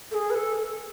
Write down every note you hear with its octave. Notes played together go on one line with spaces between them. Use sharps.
A4
G#4
B4
A4